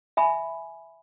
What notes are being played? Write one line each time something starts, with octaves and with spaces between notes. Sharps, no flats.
E5 G#5 B5